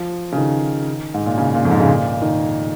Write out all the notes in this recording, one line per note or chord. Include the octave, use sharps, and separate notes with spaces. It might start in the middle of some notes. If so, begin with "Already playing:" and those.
Already playing: F3
C#3
D#3
G#2
A#2
C#3
A#2
F2
G#2
C#3
A#2
D#3